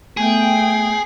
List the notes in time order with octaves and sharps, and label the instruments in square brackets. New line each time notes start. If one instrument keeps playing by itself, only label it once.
[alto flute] A3 [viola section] B3 G5 [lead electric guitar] G#4